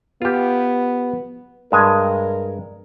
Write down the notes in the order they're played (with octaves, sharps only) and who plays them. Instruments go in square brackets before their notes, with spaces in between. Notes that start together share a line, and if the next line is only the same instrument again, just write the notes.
[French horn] B3 [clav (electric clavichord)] F4 G4
[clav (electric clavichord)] G2 G#3 G#5 [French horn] A#4